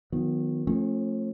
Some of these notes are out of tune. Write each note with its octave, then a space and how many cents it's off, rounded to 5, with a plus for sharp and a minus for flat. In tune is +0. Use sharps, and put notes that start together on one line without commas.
D#3 +0 F#3 -45 B3 +0
F3 +0 A3 +0 C#4 -45